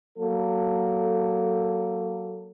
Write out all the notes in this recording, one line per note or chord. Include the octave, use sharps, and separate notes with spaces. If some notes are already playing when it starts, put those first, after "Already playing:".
F#3 A#3 A4